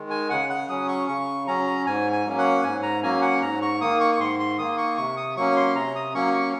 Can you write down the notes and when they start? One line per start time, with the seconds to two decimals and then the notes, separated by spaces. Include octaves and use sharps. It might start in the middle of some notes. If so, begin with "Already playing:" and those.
Already playing: D#3 G#3
0.10 G#5
0.30 C#3 F#5
0.49 F#5
0.69 F#3 C#4 D#6
0.88 C#6
1.08 C#3 C#6
1.47 F#3 C#4 A#5
1.86 G#2 G#5
2.12 G#5
2.25 F#3 A#3 C#4
2.38 F#5
2.63 G#2 G#5
2.83 A#5
3.03 F#3 A#3 C#4 G#5
3.22 F#5
3.42 G#2 A#5
3.62 C#6
3.80 D#3 A#3 D#6
4.00 C#6
4.15 C#6
4.19 G#2 C6
4.40 C6
4.59 D#3 A#3 D#6
4.78 C#6
4.97 C3 C#6
5.17 D#6
5.36 F#3 A#3 C#4 C#6
5.56 C6
5.75 C3 A#5
5.96 D#6
6.14 F#3 A#3 C#4 C#6
6.34 C#6